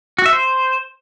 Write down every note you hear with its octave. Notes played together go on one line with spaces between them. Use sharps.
F#4
E5
C5